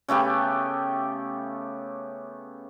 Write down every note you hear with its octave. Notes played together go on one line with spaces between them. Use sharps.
C#3 A3 B3 G4